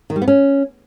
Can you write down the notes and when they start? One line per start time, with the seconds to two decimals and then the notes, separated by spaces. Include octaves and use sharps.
0.10 D#3
0.16 G3
0.22 B3
0.28 C#4